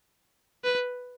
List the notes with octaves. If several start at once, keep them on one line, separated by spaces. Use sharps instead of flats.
B4